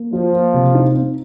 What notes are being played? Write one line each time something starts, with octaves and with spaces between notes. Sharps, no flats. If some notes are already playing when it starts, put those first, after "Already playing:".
Already playing: A#3
F3 F4
A#3
C3
D#4
C4